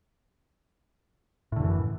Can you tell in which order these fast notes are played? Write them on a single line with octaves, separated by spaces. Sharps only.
A2 D3 F#2 E3